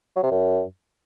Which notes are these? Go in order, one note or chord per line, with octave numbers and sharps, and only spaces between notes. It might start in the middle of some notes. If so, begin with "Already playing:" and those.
F#3
C3
F#2